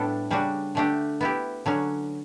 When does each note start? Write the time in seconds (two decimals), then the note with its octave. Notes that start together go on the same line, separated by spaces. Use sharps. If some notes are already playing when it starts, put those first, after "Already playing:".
Already playing: A2 G3 B3 D4 A4
0.31 C#3 G3 D4 F#4
0.75 D3 A3 D4 G4
1.21 B3 E4 G4
1.66 D3 F#3 C#4